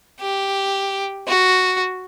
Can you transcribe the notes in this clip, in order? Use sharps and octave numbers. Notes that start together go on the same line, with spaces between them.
G4
F#4